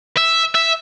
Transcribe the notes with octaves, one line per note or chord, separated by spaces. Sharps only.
E5
E5